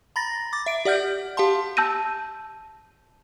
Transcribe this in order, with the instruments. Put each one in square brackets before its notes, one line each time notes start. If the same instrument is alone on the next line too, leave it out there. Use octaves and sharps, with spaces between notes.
[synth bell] A#5 B5 A6 A#6
D6 A6
E5 D7
G4 D5 F#5 F6 G6
G4 F5 A5 C6
[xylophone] A5 E6 G6 A#6 D#7